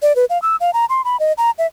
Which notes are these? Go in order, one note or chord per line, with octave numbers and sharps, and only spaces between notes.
D5
B4
F5
E6
F5
A#5
C6
B5
D#5
A#5
E5